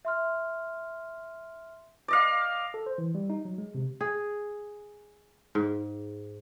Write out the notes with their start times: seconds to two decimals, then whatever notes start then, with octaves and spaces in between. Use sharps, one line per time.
0.05 E5 C6 F6
2.08 D5 D#5 F5
2.74 A4
2.86 C5
2.98 E3
3.15 G3
3.30 D#4
3.45 F#3
3.58 G#3
3.75 C3
4.01 G#4
5.55 G#2